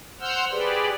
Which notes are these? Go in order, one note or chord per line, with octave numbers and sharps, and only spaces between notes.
C5 F#5 E6 F6 G6
G4 G#4 B4 D5